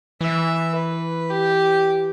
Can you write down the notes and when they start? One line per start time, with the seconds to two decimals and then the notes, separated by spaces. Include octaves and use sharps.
0.21 E3 E5
0.75 B4
1.30 G4